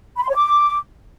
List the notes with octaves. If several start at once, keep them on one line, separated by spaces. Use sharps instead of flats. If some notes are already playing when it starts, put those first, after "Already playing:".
B5
C6
C#5
D6